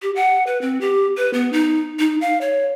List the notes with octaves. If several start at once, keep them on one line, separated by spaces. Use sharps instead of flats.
G4
F#5
B4
C4
G4
B4
B3
D#4
D#4
F5
C#5